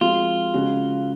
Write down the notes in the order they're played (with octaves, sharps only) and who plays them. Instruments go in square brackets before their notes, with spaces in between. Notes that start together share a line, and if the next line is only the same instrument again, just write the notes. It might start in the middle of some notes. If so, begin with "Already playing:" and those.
[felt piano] F3 G#3 C4 F#4 [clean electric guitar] F4
[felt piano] C#3 G#3 C#4 F#4